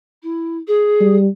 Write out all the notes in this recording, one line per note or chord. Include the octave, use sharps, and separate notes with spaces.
E4
G#4
G3